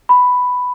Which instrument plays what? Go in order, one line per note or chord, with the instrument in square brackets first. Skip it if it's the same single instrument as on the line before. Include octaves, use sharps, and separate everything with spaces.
[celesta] B5